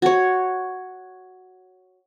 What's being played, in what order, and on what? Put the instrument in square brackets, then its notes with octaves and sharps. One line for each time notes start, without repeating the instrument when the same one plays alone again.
[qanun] F#4 C#5